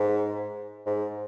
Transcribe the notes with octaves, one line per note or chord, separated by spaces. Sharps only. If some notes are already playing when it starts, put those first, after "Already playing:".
Already playing: G#2
G#2